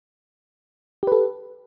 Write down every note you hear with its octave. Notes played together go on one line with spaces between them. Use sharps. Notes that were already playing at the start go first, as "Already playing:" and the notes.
G4 A4 B4